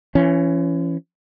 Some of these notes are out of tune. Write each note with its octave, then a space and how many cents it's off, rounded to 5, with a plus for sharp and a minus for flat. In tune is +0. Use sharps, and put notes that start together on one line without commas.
E3 +35 C#4 +0